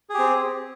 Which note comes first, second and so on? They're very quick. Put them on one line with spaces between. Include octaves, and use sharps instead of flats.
G#4 G4 C4